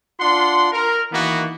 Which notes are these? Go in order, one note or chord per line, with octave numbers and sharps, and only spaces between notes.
D4 F4 F#5 C6
A#4
D#3 E3 A#3 B3 F#4